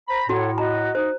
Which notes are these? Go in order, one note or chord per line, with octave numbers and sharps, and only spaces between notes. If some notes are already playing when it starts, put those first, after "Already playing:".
C5 A#5 B5
A2 E4 F#4 A4 C#5 F#5
F#4 D#5 A#5
D#4 C5